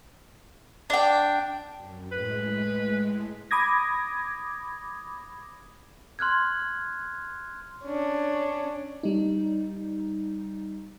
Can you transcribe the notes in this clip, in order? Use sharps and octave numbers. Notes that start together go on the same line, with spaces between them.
D4 G5
F#2
A2 G#3 B4
B5 D6 D#6 G#6 A#6
C6 F6 F#6 G#6
C#4 D4
G3 D#4